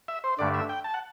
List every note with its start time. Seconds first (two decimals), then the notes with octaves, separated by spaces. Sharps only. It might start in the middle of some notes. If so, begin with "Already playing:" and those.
0.08 E5
0.24 C5
0.39 G2 D3 A3 D4 D5
0.54 E5
0.69 G5
0.84 A5
0.94 F#5